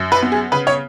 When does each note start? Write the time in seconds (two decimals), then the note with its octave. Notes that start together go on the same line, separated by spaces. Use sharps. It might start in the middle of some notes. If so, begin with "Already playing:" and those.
Already playing: F#2
0.12 B4
0.22 B3
0.32 G#4
0.52 C#3 B4
0.67 C#5